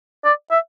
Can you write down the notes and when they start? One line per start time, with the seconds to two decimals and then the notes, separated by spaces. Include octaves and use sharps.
0.25 D5
0.51 E5